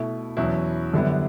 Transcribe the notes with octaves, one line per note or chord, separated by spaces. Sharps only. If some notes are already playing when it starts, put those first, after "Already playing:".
Already playing: B2 A3 E4
E2 B2 F#3 C#4 E4
F#2 D3 G3 B3 E4